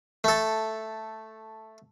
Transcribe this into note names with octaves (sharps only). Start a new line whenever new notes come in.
A3 A4